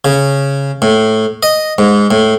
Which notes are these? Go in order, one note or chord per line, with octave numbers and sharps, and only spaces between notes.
C#3
A2
D#5
G#2
A2